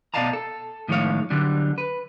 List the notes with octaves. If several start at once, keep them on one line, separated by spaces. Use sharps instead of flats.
B2 D5 D#5 F5 A5 A#5
A4
A2 D#3 F3 G#3 C#5 F5
D3 F#3 G3 D4
B4